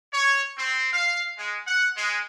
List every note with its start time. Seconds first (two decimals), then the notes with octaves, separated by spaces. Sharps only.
0.12 C#5
0.57 C4
0.92 F5
1.37 G#3
1.66 F#5
1.96 G#3